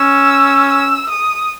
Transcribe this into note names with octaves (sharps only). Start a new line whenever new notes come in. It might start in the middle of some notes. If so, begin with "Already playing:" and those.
Already playing: C#4 E6
E6
D#6